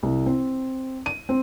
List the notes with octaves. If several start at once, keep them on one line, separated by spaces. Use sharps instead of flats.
C2
C4
D#7
C4